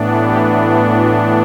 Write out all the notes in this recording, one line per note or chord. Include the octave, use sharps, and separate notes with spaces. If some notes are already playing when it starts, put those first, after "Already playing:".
Already playing: A2 E3 B3 D4
G4
G4
F#4